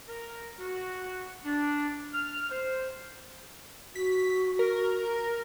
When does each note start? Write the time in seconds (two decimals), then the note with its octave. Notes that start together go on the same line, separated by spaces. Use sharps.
0.09 A#4
0.59 F#4
1.45 D4
2.14 F6
2.51 C5
3.95 F#4 B6
4.59 A#4